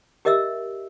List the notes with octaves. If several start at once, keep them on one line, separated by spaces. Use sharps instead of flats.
G4 A#4 D#5 E5 E6